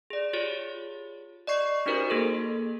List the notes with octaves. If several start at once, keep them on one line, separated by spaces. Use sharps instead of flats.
G#4 D5
F4 G4 G#4 C#5
D5 D#5 C#6 C7
C#4 D#4 F#4 G4 A#4 C5
A#3 G#4 A4